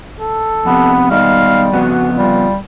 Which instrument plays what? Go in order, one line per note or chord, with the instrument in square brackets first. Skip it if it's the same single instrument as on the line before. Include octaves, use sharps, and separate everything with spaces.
[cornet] A4
[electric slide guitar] F2 C3 [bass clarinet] B3
[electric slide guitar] B2 D#3 G#3 [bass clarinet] G3 [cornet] F5
[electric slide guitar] F2 C#3 B3 [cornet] F#4
[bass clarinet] G3 [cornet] F4